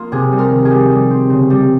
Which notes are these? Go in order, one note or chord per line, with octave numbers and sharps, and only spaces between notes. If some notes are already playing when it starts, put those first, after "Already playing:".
Already playing: A#3 D#4 F4
C3 G#4
G3
A#4
D#3
G#4
G3
G3
C4
C#3
G3